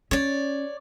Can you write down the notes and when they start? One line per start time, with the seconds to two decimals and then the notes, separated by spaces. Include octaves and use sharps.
0.11 C#4 C#5 D5